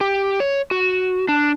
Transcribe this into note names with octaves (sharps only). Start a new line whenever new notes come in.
G4
C#5
F#4
D4